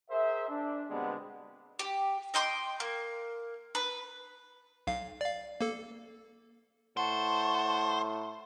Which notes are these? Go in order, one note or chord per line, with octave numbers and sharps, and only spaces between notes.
G#4 A#4 C5 E5
D4
B2 D3 G3 G#3 B3 C4
G4
D#5 G5 C6 D6
A#3
B4
B1 F5
D5 F5
A#3 A4
A2 C5 F#5 A5 C#6